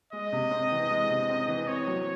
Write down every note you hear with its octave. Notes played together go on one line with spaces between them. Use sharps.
G#3 D#5
C3
C4
E3
G#3
C3
C4
E3
C4 C#5
F#3